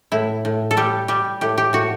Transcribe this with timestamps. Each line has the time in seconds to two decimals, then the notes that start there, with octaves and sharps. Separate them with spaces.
0.12 A2 E4
0.45 A2
0.71 A4
0.77 G3 G4
1.08 G3 G4
1.41 A2 G4
1.58 G4
1.73 A2 F#4